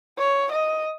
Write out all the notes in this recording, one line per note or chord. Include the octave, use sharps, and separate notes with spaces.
C#5
D#5